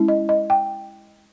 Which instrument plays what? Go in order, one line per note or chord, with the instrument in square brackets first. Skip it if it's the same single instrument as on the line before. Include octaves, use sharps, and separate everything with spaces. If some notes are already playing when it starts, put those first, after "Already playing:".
Already playing: [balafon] G#3 C#4 E4
D#5
D#5
G5